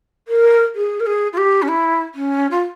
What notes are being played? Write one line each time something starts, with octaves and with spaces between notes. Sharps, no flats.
A#4
G#4
A#4
G#4
F4
G4
C#4
E4
C#4
F4